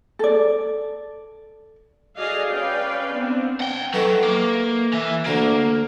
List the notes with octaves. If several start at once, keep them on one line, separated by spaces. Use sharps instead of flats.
A4 D5
F#4 G#4 A4 D5 D#5 F5
C#4 B4 D5 F5 G5
B3 C4 D4
F#5 G5
D#3 F#3 A3 B3
A#3
E3 E5
D2 D3 A#3